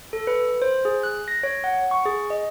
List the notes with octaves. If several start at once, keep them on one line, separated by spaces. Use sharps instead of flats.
A4
B4
C5
G#4
F#6
A#6
C#5
F#5
C#6
G#4
D#5